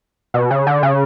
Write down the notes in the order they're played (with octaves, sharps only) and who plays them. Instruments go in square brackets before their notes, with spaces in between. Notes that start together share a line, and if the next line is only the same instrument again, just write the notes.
[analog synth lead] B2
C#3
D3
C#3